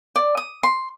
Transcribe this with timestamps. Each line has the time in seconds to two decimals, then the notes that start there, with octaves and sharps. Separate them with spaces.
0.16 D5
0.37 D#6
0.63 C6